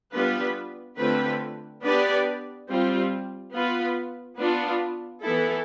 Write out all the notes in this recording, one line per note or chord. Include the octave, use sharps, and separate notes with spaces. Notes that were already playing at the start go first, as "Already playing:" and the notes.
G3 B3 D4 F4 B4
D3 A3 C4 F4 B4
B3 D4 G4 B4 D5
G3 C4 F4
B3 F4 B4
B3 D4 F4
E3 B3 E4 A4